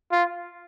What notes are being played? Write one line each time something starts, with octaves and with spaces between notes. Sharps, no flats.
F4